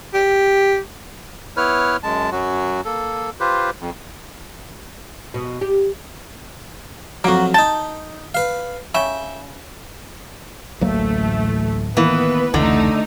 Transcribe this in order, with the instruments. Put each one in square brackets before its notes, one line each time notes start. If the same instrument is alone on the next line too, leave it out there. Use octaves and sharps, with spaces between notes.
[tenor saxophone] G4
[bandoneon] B3 E4 B4 C#5 F6
F#2 G#3 A5
F#2 F#3 F#4
A#3 A4
F4 G4 B4 C5
F2
[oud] B2
G4
[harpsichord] F2 F#3 [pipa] A#3 F#4
[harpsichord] D#4 G5 [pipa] A5
[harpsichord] B4 F5
[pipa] C#3 [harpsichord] E5 G5
[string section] A1 A3 [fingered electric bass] D2 F#3 A#3
[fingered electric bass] D#3 A#3 [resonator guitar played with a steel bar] E3 [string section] B3 B4
[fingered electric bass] F1 C#2 E3 [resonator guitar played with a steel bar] D3 [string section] A3 D#4